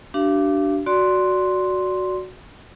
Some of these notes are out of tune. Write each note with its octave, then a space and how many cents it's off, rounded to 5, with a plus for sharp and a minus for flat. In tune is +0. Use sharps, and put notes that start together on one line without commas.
D4 +0 G4 -45 F5 -35
F#4 +0 D5 -10 C6 +0